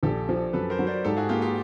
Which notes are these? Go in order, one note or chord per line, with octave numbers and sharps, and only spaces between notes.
A#1 G4 A4
F3
F#2 A4 B4
A#4 C5
F#3
C5 D5
G#2 G4 A4
F#4 G#4
A#3 F4 G4
F4 G4